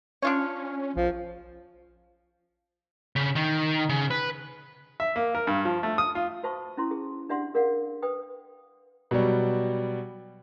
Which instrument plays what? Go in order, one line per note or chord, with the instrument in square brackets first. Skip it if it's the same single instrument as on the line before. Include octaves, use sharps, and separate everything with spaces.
[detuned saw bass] C#4 [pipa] D4 F4 C#5
[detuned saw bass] A#1 [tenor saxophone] F3
[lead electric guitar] C#3
D#3
C#3
B4
[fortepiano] E5
A#3
A#4
G2
F3
A3
D#6
F4
[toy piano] F#4 C5 E5 A5 C#6
C#4 E4 C6
G#4
D4 G4 D5 E5 F#5 C6
G#4 A#4 D5 F5 F#5
B4 G5 D#6
[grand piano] B2 F#3 G3